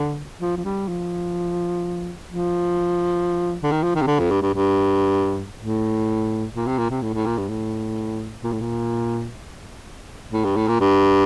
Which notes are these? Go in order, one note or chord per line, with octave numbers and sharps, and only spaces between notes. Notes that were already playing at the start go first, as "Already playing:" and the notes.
Already playing: D3
F3
F3
G3
F3
F3
D3
D#3
F3
D#3
C3
D3
F2
G2
G2
G2
A2
A#2
C3
A#2
C3
A2
A2
A#2
G2
A2
A#2
A2
A#2
A2
G2
A2
A#2
G2